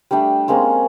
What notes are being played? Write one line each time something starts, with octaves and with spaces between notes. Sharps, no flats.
G3 A3 D4 G5
G#3 A#3 C4 C#4